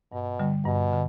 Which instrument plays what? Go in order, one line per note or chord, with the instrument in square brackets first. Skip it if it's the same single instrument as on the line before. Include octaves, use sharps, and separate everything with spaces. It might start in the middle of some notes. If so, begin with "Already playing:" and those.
[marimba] G2 [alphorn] B2
[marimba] D3 G3
[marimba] G2 [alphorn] B2
[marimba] D3